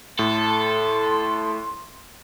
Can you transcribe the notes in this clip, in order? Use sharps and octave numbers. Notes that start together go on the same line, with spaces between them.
A2 A4 C6